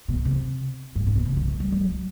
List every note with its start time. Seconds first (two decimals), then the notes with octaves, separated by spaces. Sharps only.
0.08 B2
0.25 C3
0.96 G2
1.07 A2
1.16 B2
1.26 C3
1.37 D3
1.48 E3
1.60 G3
1.72 G3
1.84 F#3